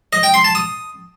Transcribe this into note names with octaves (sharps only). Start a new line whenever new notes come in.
D#5
G5
C6
A5
D#6